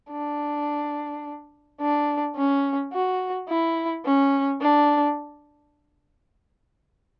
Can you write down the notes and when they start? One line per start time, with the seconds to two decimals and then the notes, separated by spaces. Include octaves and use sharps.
0.11 D4
1.80 D4
2.36 C#4
2.93 F#4
3.49 E4
4.05 C#4
4.61 D4